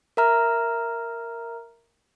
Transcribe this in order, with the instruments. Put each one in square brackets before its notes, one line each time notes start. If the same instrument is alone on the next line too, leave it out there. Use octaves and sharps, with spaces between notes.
[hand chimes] A#4 E5 A#5 F6